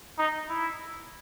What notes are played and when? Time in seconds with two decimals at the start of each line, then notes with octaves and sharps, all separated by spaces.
0.18 D#4
0.49 E4